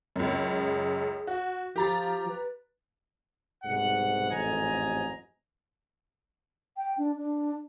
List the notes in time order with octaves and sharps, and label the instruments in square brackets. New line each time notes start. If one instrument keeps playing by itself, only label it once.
[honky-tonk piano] C#2 F#2
[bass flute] G#4
[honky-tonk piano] F#4
[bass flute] F3 [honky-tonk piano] G4 A#5 A6
[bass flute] B4
[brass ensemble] C2 G#2 B2 F#5
A1 F2 G#2 D#5 G#5 A#5
[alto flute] G5
D4
D4